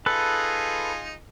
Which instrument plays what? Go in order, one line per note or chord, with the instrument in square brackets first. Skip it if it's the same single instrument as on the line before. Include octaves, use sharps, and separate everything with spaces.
[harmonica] D#4 F4 G#4 [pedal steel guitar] A4 B4